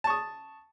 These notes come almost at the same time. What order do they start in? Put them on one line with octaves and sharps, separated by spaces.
A5 C#6 D#6